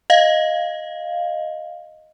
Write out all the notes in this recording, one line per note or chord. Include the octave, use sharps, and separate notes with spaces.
D#5 F5